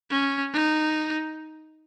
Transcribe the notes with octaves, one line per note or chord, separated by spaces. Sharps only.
C#4
D#4